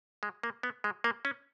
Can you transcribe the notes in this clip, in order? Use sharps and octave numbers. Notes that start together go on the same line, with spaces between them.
G#3
A#3
B3
G#3
A#3
C#4